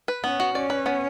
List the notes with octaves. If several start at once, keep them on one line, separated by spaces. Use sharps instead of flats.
B4
B3 C#4
F#4
C#4 D5
B4
B3